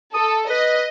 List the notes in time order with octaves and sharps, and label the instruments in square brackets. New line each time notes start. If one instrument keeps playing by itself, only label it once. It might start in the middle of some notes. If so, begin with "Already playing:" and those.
[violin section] A4 [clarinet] D#6
[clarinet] B4 [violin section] D#5